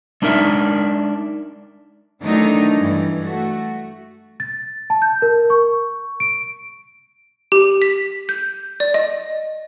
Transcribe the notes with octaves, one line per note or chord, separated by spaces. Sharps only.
G#3 D4 D#4 A#4 E5
D#3 E3 F#3 A3 D4 D#4
G2 E3
A3 F#4
A6
A5
G6
A#4
C#6
D7
G4
B6
G6
D5
D#5